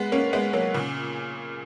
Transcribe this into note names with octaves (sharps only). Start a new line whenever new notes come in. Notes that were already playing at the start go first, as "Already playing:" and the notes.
Already playing: G#3 B3
A#3 C#4
G#3 B3
F#3 A#3
A#2 C#3